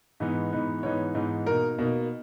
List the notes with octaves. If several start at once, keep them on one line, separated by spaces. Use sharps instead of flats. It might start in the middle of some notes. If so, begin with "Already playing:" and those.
G#2 E3 B3 D#4
G#2 E3 B3 D#4
G#2 E3 B3 D#4 C#5
G#2 E3 B3 D#4
B2 A#3 D#4 A#4
B2 A#3 D#4